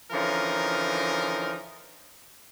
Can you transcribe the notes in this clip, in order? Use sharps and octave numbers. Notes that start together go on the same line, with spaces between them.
D3 E3 F3 C#4 D#4 A#4